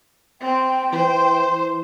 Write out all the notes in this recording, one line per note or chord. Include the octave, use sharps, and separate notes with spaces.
C4 G5
E3 C5